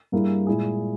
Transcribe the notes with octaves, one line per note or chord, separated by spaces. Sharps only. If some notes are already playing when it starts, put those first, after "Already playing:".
G2 G3 A#3 E4 G#4
A#2 G#3 E4 G#4